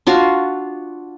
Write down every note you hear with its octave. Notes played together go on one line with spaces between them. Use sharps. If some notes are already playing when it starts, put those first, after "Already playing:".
D4 F4 F#4 F5